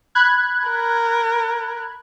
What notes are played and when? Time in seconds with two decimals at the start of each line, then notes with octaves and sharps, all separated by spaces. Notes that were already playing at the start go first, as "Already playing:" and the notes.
0.15 B5 F#6 G#6
0.69 A#4